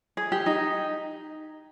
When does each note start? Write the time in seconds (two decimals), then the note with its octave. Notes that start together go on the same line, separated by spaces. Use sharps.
0.17 G#4
0.32 G4
0.46 D#4